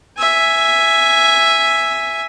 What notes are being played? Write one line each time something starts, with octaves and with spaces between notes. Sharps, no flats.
E5 G#5